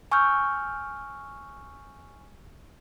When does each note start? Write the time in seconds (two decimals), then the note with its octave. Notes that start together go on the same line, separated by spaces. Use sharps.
0.12 G#5 C#6 E6 F6 G6